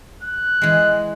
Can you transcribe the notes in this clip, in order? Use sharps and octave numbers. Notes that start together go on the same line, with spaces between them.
F#6
E3 G#3